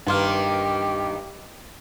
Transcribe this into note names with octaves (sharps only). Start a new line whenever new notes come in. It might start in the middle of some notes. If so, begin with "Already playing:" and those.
G2 D#3 A#3 G4 B4 C6 F6